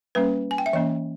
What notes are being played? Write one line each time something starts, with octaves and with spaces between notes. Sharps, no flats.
G3 A#3 C#4 B4
G#5
G5
E5
E3 A#3 C#4 D#5